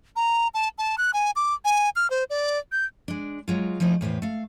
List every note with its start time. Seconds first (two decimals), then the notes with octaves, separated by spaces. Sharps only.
0.16 A#5
0.54 A5
0.78 A5
0.98 F#6
1.13 G#5
1.36 D6
1.65 G#5
1.96 F6
2.10 C5
2.30 D5
2.72 G6
3.08 G#3 D4
3.48 F#3 G#3 F4
3.80 F3 A3 D#4 E4 G#4
4.01 E2 A2 B4 C5
4.22 A3 F5